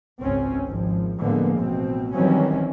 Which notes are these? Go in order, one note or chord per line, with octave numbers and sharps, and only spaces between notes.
G#1 C#2 C4 C#4
G#1 F3
A2 D3 F3 G#3 A#3 B3
A1 B2 C4
D#3 E3 F#3 G3 C4 C#4